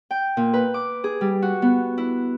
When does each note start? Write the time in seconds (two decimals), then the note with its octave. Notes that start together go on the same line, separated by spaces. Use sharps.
0.11 G5
0.37 A#2
0.53 B4
0.74 D6
1.04 G#4
1.21 G3
1.42 F#4
1.62 B3
1.98 E4